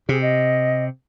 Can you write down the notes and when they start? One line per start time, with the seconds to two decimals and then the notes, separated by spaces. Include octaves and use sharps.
0.09 C3 G#4
0.22 D#5